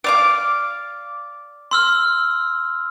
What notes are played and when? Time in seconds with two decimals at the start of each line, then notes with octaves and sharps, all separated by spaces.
0.04 D5 F5 D6
1.71 C6 E6 F6